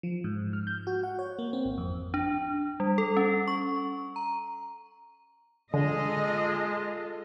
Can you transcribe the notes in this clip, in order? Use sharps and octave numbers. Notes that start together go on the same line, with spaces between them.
F3
G#2
F6
G6
F#4
F#5
C#5
A#3
C4
G#1
F2
D4
G3
A4
C#4
C#6
A#5
D3 G#3 F4 A4 D#5